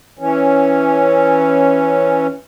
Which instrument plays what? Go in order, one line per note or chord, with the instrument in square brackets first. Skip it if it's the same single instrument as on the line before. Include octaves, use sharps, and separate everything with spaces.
[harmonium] E3 C#4